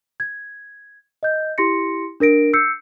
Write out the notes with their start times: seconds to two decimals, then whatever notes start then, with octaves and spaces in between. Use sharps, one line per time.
0.20 G#6
1.23 D#5 G6
1.58 E4 G4 C6 A#6 C#7
2.20 D4 A#4 A#6 D7
2.53 E6 G6 C7 C#7